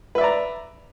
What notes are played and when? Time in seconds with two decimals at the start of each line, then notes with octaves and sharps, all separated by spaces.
0.15 B4
0.18 E5
0.21 D5
0.24 A#5